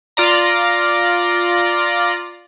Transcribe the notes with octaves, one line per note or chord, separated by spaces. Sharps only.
F4 D5 A#5